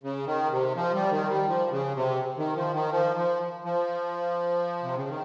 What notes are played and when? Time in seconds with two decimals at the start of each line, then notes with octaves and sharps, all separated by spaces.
0.04 C#3
0.27 D#3
0.51 C3
0.76 F3
0.94 G3
1.11 D#3
1.29 G3
1.48 F3
1.71 C#3
1.96 C3
2.38 D#3
2.56 F3
2.74 D#3
2.92 F3
3.17 F3
3.65 F3
4.83 C3
4.96 C#3
5.09 D#3